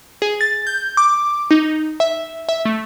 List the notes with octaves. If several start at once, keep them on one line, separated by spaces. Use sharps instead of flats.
G#4
A6
G6
D6
D#4
E5
E5
A3